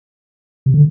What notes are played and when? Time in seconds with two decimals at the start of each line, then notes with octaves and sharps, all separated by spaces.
0.66 C3
0.74 D3